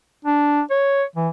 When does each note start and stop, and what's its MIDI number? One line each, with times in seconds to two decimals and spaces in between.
0.25 0.61 62
0.70 1.03 73
1.15 1.28 52